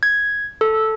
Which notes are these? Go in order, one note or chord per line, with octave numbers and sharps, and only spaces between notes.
G#6
A4